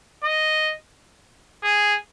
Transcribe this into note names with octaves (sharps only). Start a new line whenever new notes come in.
D#5
G#4